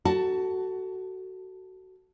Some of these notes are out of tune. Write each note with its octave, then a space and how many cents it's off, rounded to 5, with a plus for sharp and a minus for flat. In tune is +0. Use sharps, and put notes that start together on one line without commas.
F#4 +20 A4 +10 A5 +0